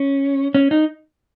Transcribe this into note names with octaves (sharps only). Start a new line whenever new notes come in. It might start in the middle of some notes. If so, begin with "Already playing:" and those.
Already playing: C#4
C#4
D#4